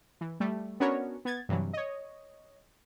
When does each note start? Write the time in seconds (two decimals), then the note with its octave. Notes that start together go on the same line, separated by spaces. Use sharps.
0.21 E3
0.40 G3 A3
0.80 B3 C#4 D4 F#4 A#4 C#5
1.25 B3 G#6 A6
1.49 G2 C3 E3 F#3
1.73 C#5 D#5